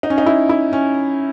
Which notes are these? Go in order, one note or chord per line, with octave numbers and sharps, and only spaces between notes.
D#4
C#4
D#4
E4
E4
C#4